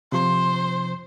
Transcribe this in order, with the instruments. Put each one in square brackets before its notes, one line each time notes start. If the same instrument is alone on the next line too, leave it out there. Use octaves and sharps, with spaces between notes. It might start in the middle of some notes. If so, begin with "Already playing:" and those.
[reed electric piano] C3 F3 [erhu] C5